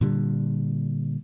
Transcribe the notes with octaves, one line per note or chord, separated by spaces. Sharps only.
A#2 D3 G3